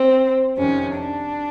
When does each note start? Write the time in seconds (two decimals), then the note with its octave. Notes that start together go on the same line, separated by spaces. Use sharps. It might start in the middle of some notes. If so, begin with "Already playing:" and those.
Already playing: C4
0.56 F2 C3 D#3 C#4
0.98 D4